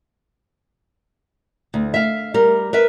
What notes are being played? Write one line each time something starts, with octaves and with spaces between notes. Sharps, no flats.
D2
E5 F5
G3 A#4
A#4 B4 E5